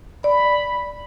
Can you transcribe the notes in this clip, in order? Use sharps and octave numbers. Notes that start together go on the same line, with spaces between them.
D5 B5